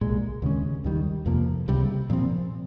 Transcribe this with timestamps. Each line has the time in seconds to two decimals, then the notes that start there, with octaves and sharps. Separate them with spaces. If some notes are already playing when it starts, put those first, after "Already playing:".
0.01 C2 A#2 G#3
0.42 D#2 C#3 G#3 C#4
0.84 D#2 D#3 G3
1.26 F2 C3 F3 A#3
1.68 C#2 C3 G3 C4
2.10 A#2 F3 C4